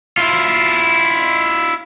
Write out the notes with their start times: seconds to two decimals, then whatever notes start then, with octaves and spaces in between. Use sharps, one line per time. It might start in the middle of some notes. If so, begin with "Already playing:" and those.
0.17 E4 F4